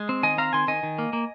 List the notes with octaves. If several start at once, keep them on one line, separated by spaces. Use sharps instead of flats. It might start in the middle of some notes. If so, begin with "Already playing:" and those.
Already playing: G#3
C4
D#3 D#5 G#5
C4 F5 A#5
D#3 G#5 C6
D#3 D#5 G#5
D#3
A#3
A#3